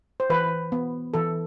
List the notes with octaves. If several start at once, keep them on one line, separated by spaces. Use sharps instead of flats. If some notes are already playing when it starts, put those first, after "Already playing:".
C5
E3 B4
B3
E3 A4